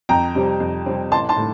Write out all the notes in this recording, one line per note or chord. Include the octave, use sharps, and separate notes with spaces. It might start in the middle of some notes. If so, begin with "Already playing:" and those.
F2 G5 A#5
C3 G3 C4
F2
C3 G3 C4
A1 A5 C6
A5 C6
A2